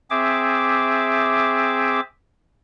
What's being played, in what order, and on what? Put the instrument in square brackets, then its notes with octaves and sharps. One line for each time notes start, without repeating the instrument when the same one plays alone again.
[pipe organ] C4 G#4 E5 D6